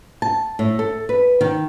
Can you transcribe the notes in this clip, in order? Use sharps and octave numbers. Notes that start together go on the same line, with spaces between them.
A5
A2
A4
B4
D#3